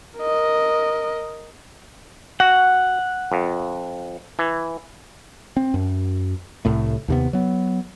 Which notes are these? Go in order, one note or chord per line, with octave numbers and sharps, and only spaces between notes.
A#4 D#5
F#4 F#5
F2
E3
C4
F#2
C2 A2 A3
D#2 C3 B3
F#3 B3